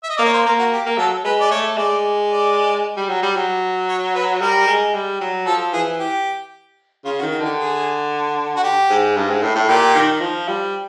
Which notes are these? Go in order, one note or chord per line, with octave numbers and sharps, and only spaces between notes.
E5
D#5
A#3 D5
C#5
C5
A#3 A#4
F#4
G4
A#3
F#3 A4
G#3 B4
D5
A3 C#5
G#3 D5
D5
G3
F#3
G3
F#3
C#5
B4
G3 A#4
G#3
G3
F#3
F3 A4
E3 G#4
G4
C#3 F4
F#4
D#3
F#4
D3 G4
G#4
F#4
G4
G#2
G2
G#2
A2
A2
A#2 G4
D#3
F3
G3